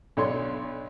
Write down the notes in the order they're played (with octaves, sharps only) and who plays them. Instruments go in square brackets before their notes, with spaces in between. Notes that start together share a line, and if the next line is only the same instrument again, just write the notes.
[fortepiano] B1 D4 C#5 C6